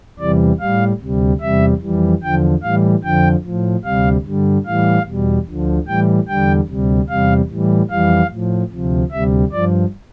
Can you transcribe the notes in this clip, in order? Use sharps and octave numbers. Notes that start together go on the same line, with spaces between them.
E2 C3 E3 G3 D5
A2 G3 F5
D2 C3 G3
E2 C3 G3 E5
F2 E3 G3
E2 D3 F3 G5
A2 E3 G3 F5
F2 D3 F3 G5
A2 F3
D2 C3 G3 F5
G2 D3 G3
A2 E3 G3 F5
E2 B2 G3
D2 D3 F3
A2 E3 G3 G5
E2 D3 G3 G5
D2 C3 G3
E2 C3 G3 F5
A2 E3 G3
F2 E3 G3 F5
A2 F3
D2 C3 F3
D2 C3 G3 E5
G2 F3 D5